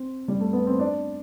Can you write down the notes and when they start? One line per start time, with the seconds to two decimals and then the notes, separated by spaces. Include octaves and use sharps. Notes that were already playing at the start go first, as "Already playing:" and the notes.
Already playing: C4
0.28 G3
0.40 A3
0.53 B3
0.67 C4
0.79 D4